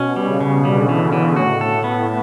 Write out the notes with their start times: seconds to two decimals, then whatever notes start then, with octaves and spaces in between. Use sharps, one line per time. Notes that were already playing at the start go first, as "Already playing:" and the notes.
Already playing: B2 C#4
0.16 G3
0.28 C#3
0.41 C#3
0.64 D3 G3
0.89 E3
1.00 B2
1.13 E3
1.36 A2 F#4
1.61 A4
1.72 A2
1.84 B3